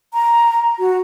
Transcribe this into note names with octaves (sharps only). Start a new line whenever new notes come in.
A#5
F#4